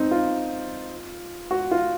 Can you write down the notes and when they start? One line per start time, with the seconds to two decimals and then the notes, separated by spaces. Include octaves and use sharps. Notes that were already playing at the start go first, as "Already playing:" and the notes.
Already playing: C4 D#4
0.11 F4
1.51 F#4
1.71 F4